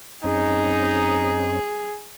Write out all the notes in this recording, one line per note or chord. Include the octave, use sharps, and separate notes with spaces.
F#2 C4 C#4 D#4 G#4